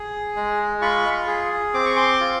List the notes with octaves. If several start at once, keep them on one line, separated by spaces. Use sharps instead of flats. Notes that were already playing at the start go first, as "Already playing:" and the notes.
Already playing: G#4
G#3
F4 B5 C#6
G#4
C4 D6
C#6
C6 D6
F4